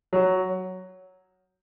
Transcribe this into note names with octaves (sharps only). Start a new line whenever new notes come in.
F#3